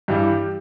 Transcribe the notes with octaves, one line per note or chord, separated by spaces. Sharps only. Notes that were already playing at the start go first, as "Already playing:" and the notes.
G2 E3 G3 G4